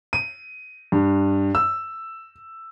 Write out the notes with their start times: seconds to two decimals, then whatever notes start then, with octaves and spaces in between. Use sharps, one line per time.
0.13 D#7
0.92 G2
1.55 E6